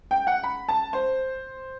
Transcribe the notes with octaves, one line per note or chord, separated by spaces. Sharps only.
G5
F#5
B5
A5
C5